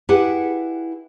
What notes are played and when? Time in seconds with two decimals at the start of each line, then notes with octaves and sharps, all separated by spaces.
0.09 E4 G4 G#4 B4 F#5